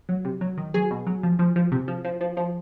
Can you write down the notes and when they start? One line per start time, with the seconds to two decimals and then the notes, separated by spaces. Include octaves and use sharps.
0.09 F#3
0.25 C3
0.41 F#3
0.58 D#3
0.74 F#3 G#4
0.91 B2
1.07 F#3
1.23 F3
1.39 F3
1.56 F3
1.72 C3
1.88 F3
2.05 F3
2.21 F3
2.37 F3